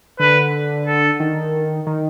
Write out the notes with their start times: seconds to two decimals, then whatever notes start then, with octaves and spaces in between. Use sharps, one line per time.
0.19 D3 B4
0.87 A4
1.20 D#3
1.87 D#3